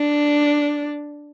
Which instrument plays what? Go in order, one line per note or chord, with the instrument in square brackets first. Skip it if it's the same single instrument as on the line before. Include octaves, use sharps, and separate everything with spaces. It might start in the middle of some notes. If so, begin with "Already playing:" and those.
Already playing: [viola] D4